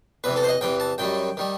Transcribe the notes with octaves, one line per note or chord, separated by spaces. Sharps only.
E2 C3 E3 B4
A4
C5
D#5
E2 C3 E3 G5
A5
F#2 D#3 G3 G5
D#3 G3